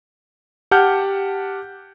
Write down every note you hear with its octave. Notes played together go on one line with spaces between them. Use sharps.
G4 F#5 A5 F6 G6